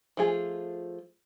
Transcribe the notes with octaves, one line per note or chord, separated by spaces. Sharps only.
F3 A3 F4 G#4